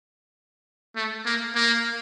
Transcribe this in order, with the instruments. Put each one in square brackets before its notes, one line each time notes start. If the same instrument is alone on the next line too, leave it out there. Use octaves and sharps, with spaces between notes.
[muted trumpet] A3
A#3
A#3